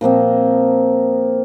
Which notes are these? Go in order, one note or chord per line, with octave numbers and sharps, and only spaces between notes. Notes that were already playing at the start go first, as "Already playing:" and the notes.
A#2 F3 A#3 C4